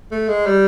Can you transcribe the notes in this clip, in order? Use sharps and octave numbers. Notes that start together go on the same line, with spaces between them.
A3
G#3
G3